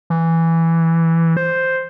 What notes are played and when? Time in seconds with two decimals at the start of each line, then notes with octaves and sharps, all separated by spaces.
0.10 E3
1.37 C5